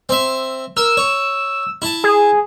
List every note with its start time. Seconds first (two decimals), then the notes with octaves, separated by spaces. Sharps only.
0.09 C4 E5
0.77 A#4 E6
0.97 C#5
1.82 E4 A5
2.04 G#4